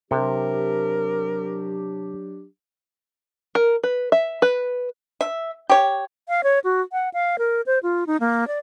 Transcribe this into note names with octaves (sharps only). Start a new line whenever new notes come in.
C3 F#3 D4 G4 A#4
A#4
B4
E5
B4
E5
G4 C#5
F5
C#5
F#4
F#5
F5
A#4
C5
F4
D#4
A#3
D5